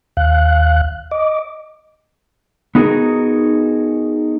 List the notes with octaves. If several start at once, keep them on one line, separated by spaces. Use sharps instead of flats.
D#2 F5 F#6
D#5 D6
B3 D#4 F#4 G#4 A#4